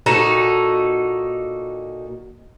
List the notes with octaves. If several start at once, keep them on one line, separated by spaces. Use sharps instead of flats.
A#2 D#4 F#4 A4